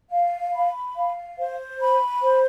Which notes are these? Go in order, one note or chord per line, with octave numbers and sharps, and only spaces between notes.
F5
B5
F5
C5
B5
C5